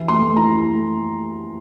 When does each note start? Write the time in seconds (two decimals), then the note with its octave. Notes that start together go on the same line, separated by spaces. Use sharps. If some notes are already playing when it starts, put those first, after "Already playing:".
Already playing: E3 E4
0.08 A3 C6
0.22 A3
0.37 E4 A#5
0.52 E4
0.66 A3